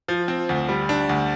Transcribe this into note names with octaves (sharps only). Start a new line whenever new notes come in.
F3
C4
D2
G3
D4
D2